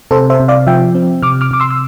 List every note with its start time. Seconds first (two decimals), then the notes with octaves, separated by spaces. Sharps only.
0.11 C3 A4 C5
0.30 C5 E5
0.40 C3
0.48 D5 F5
0.67 F3 E5 G5
0.95 C4
1.22 C3 D6 F6
1.41 D6 F6
1.51 C3 D6
1.60 C6 E6
1.71 E6